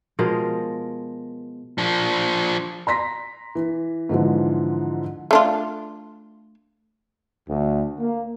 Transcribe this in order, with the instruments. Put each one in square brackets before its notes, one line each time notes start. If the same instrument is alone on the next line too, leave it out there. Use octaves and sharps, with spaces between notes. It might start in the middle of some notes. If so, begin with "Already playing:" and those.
[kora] B2 F3 G#3 A#4
[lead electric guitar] F3 D4
[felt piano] A#5 C6 A#6 B6
E3
G#2 D3 E3 F3
[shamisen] A3 D4 F4
[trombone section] D2
A#3